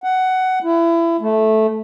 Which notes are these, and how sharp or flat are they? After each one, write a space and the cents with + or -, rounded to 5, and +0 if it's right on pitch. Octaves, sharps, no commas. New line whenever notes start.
F#5 +15
E4 +25
A3 -10